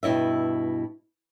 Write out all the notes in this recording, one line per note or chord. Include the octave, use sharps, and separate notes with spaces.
G2 B2 E4 D#5 E5